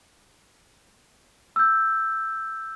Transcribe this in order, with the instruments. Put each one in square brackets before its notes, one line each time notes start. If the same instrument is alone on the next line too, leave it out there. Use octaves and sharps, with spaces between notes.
[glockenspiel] E6 G6